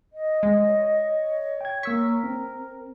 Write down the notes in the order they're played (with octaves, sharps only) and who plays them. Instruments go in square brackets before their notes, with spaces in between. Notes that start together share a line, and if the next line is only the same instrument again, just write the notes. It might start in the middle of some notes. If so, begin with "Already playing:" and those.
[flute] D#5
[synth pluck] G#3
[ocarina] C#5
[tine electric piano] G5 G#6
[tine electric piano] A#3 E6 B6 [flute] A#4 [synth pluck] C#6
[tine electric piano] C4